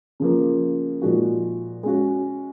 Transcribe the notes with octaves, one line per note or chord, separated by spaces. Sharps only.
C#3 F3 A#3
A#2 F3 G#3 D#4 F#4
G#3 C#4 F#4